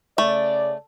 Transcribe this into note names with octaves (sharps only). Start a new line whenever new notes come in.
C#3 A3 D5